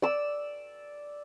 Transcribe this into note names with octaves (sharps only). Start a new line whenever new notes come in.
D5 E6